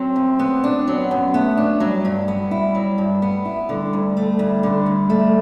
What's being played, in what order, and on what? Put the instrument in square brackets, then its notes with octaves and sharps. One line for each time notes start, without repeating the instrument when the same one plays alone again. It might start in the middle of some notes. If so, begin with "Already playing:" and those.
Already playing: [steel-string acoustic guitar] F#3 [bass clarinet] C4
[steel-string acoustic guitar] F#2
B3
D4
[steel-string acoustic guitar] F#3 [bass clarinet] B3
[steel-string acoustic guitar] F#2
[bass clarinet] A3 [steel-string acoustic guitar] B3
[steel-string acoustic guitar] D4
[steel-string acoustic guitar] F#3 [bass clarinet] G3
[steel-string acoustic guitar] G2
B3
E4
F#3
G2
B3
E4
[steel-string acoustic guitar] D3 [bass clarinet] G3
[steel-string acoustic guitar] D2
A3
D2
D3
D2
A3